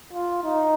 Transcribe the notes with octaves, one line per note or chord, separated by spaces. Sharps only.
F4
D#4